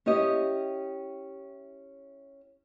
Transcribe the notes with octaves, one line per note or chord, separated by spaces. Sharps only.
C#4 E4 G4 D#5